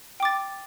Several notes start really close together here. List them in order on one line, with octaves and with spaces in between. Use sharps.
G5 D6 A6